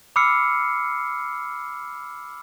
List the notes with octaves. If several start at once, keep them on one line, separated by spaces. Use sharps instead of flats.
B5 D6 E6 F6 C7 C#7